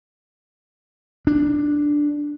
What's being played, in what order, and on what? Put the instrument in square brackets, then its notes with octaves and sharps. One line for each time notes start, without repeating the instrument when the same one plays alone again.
[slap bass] D4